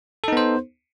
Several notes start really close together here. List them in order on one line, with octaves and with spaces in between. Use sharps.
A4 D#4 B3 C5